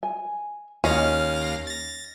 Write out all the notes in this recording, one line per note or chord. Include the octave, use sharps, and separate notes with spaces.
G#5
D#2 C#4 C#5 D#5 F5 A#6
A6 A#6